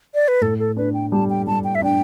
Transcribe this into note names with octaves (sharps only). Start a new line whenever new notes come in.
D5
B4
A2 A4
A4
D4 B4
G5
G3 A5
G5
G3 A5
G5
E5
D4 G5